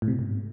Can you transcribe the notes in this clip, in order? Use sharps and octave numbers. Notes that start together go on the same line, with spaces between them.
A2
C3
B2
G#2